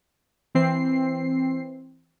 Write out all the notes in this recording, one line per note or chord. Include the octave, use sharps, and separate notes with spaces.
E3 C4 C7